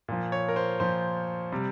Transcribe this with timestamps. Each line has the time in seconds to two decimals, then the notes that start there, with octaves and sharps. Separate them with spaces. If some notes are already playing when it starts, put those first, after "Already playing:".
0.08 A#2 F3
0.32 C#5
0.48 A#4
0.56 C5
0.80 A#2 F3 C5
1.52 C3 G3